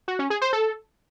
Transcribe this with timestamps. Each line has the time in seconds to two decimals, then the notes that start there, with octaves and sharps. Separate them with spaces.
0.08 F#4
0.19 C#4
0.30 G#4
0.42 C5
0.53 A4